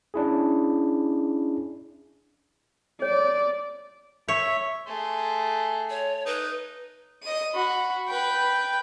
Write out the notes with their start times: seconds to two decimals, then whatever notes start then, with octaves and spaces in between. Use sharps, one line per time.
0.14 C#4 D4 E4 G#4
3.02 C#5 D5
4.28 C#5 E5
4.87 A3 G#4 C6
5.90 C#5
6.26 D#4 B4
7.23 D#5 D#7
7.54 F#4 B5
8.09 B4 G5